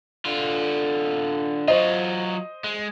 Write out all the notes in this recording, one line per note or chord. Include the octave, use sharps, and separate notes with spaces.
D3 F4
F#3 F4 C5 D#5
G#3